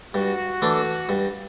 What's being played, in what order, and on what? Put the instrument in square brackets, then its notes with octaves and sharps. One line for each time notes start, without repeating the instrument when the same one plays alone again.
[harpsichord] G2 [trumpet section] F#4
[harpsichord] E3 A3 D4
G2